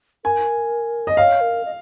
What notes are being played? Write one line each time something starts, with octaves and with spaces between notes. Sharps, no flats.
A#4 G#5
D#5
C#5 F5
A#4
D#5